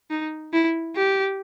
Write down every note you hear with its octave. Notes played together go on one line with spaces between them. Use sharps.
D#4
E4
G4